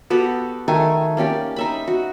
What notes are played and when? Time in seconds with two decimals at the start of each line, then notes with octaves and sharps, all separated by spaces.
0.10 B3 F#4 G4 A4
0.68 D#3 A3 G#5
1.17 A#3 C#4 G4 D5
1.56 D#4 E5 B5
1.88 F#4